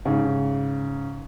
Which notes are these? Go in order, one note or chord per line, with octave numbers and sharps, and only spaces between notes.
G#2 C#3